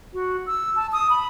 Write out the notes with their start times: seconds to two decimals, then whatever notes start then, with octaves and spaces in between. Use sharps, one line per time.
0.14 F#4
0.46 E6
0.76 A5
0.93 D#6
1.10 B5